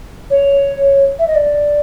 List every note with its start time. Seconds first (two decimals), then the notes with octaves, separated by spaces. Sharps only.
0.30 C#5
1.19 E5
1.27 D#5
1.35 D5